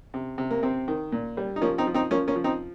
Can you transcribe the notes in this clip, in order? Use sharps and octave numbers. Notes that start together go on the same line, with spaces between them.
C3
C3
A#3
C3 C4
D#3
A#2
G3
D#4
F3 A#3 C#4
C4 D#4
F3
C4 D#4
F3 A#3 C#4
A#3 C#4
F3
C4 D#4